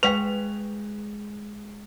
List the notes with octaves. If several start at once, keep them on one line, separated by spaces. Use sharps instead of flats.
G#3 B4 F5 G5 C#6 F7